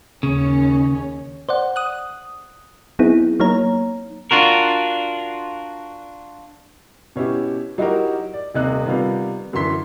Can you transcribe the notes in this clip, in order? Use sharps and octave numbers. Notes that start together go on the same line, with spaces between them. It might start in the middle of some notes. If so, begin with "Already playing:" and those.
D#2 C#3 C#4
C5 D5 F#5
D#6 F#6
F#3 B3 C4 D#4 E4 G#4
F#3 A#3 D#4 C#5 A#5
D4 F4 F#4 A#4
B2 C#4 E4 G4
F#3 D#4 E4 F#4 G4 A#4
D5
D#1 C3 D#4 F#6
C3 D#3 G3 B3 F4
F#2 D3 E3 C6 B6